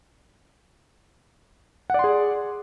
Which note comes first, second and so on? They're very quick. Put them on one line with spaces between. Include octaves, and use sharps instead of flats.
F#5 D5 C6 G#4